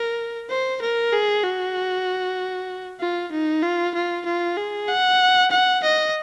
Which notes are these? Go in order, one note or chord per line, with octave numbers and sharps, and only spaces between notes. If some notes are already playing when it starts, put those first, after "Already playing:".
Already playing: A#4
C5
A#4
G#4
F#4
F4
D#4
F4
F4
F4
G#4
F#5
F#5
D#5